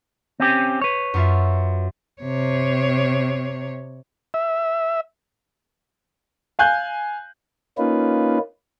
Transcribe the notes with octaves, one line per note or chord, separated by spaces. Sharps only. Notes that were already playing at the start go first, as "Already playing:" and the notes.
C4 C#4 G4
B4 C#5
F#2 F4 E5
C3 C#5
E5
F5 G#5 F#6 G6
A#3 C#4 D#4 F4 B4